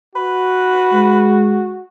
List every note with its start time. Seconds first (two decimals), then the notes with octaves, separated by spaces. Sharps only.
0.15 F#4 B4
0.93 G#3